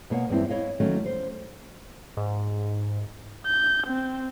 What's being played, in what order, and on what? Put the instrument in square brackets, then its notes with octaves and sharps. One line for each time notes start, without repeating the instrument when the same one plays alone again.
[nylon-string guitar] B2 A#3 C#5 F#5
E2 G2 C4 E4
E4 C#5 D#5 F5
D#3 E3 F#3 A3 A#3 C#4
C5
[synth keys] G#2
[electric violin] G6
C4